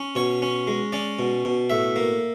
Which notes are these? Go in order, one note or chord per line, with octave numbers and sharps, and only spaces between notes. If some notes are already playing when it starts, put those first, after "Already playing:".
Already playing: C#4
B2 C#5
C#4
G#3
C#4 D5
B2
B2
A2 E5
A#3